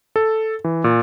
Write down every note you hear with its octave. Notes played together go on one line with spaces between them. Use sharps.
A4
E3
A#2